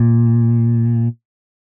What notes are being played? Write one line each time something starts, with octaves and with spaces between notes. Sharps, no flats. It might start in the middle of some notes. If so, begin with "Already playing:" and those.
Already playing: A#2